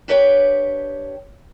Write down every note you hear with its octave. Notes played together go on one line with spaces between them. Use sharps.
D4 G4 B4 C#5 F5 G5